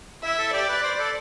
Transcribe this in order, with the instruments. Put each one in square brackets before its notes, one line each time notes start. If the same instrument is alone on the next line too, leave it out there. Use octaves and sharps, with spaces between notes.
[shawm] E4 [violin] E5
[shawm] A4
[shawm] G4 [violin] D5
[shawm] B4
C5
A4